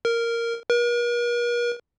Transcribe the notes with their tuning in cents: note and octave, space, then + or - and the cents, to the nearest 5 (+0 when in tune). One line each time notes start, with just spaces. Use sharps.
A#4 -5
A#4 +45